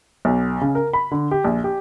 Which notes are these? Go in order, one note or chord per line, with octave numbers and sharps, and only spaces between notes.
B1
C#3
A#4
B5
D3
G4
A#1
G4